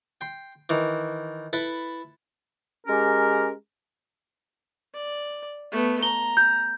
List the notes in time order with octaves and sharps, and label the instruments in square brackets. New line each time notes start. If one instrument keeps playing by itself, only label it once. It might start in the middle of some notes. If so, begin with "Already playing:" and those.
[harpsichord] G5 C6
D#3 E3
E4 A4 B4
[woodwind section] G#3 C#4 G4 A#4
[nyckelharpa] D5
A3 B3
[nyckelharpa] A#5 [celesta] G7
[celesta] G6